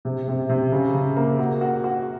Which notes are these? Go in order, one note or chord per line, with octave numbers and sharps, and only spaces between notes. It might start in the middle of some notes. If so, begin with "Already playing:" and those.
C3
C3
C3
C#3
C#3
A#3
F#4
F#4
F#4